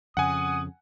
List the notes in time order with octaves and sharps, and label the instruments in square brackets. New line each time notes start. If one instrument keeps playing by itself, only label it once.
[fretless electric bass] F2 C#3 [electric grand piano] F#5 G#5 [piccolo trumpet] D#6